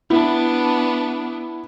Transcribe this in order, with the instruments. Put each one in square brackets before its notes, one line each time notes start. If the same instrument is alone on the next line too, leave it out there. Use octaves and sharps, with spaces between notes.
[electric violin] B3 D4 [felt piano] E4